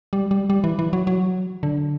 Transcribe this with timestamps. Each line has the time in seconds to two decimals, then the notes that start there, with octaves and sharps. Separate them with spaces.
0.13 G3
0.31 G3
0.50 G3
0.64 E3
0.79 E3
0.93 F#3
1.07 F#3
1.63 D3